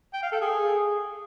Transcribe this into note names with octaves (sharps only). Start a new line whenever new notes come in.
G5
F5
A4
G#4